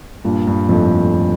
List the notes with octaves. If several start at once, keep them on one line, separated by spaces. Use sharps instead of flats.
G2 A#2
G2
F2 A2